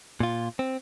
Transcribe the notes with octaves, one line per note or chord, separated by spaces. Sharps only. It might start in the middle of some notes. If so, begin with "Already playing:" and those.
A#2 F4
C4